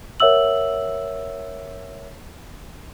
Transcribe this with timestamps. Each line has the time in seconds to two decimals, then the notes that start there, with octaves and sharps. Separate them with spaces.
0.20 A#4 C#5 E5 F#5 E6 F#7